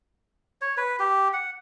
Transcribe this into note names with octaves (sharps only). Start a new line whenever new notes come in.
C#5
B4
G4
F#5